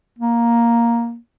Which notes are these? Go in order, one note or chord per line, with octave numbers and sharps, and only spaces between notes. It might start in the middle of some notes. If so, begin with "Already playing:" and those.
A#3